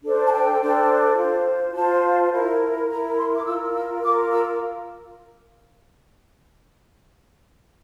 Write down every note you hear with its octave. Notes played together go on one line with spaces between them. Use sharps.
D4 A4 C5
A5
G5
D4 A4 C5
F4 C5
F4 C5 A5
E4 A#4
E4 A#4 A#5
C6
D6
F4 A#4 E6
E6
F4 A#4 D6
E6